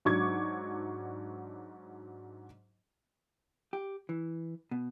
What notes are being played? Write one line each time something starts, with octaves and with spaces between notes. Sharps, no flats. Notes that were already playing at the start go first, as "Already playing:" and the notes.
G#2 F#3 D4 C#6 D6 G#6
G4
E3
B2